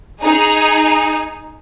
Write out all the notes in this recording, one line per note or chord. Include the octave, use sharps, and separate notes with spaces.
D#4 G#4